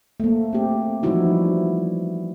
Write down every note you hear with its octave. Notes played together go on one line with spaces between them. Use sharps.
A3 A#3
C4 G4
E3 F3 G3 D#4 E4 F#4